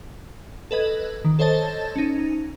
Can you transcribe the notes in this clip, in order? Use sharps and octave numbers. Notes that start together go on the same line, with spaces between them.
A4 B4 D#5 G#6
D#3
A4 C5 C#5 D#5 A5 A6
C#4 D#4